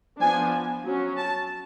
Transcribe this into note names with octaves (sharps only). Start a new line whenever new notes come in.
F3 B3 D4 G#5
F#3 C#4
A5